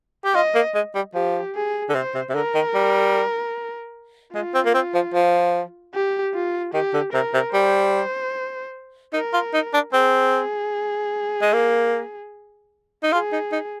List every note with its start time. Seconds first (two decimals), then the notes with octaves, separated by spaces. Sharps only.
0.25 G4
0.35 F4 D#5
0.55 A#3
0.75 G#3
0.95 G3
1.15 F3 G4
1.55 G#4
1.89 D3
1.95 C3 C5
2.15 C3
2.29 C3
2.35 D3 A#4
2.55 D#3
2.75 G3
4.34 G#3 F4
4.55 C4
4.66 A#3
4.74 C4
4.94 F3
5.14 F3
5.94 G4
6.34 F4
6.74 D#3 G4
6.94 D3
7.13 C3 A#4
7.34 C3
7.53 G3 C5
9.13 D#4 A#4
9.33 F4
9.53 D#4
9.74 D4
9.93 C4 G#4
11.42 G#3
11.53 A#3
13.03 D#4
13.13 F4 G#4
13.32 D#4
13.53 D#4